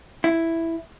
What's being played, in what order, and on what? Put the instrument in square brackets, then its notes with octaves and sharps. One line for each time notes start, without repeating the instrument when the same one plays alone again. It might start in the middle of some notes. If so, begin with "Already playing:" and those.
[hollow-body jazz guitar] E4